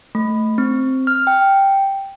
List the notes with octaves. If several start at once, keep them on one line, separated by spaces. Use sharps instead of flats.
A3
C4
F6
G5